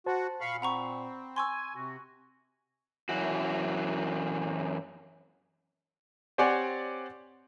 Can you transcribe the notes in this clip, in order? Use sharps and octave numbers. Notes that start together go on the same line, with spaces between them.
F#4 C5 A5
A#2 F5 B5 C#6
C4 F#5 A#5 B5 C#6
G#5 C6 C#6 E6
C3 F#4
F#2 A2 E3 F#4
C4 G4 C#5 D5 F#5 G#5